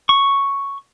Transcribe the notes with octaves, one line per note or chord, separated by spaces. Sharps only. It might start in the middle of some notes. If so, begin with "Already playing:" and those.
C#6